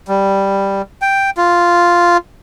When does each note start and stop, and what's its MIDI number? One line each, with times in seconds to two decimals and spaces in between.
0.08 0.82 55
1.02 1.30 79
1.37 2.17 65